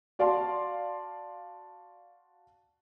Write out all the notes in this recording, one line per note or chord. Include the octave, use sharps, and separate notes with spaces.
F#4 D5 F5 A5 C6